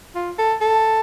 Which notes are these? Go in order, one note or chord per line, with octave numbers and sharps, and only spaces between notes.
F4
A4
A4